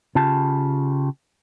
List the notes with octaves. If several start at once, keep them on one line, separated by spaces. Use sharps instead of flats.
C#3 F4 G4 A5